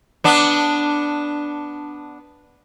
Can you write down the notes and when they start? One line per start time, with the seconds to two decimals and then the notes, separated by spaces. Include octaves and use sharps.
0.24 B3 D4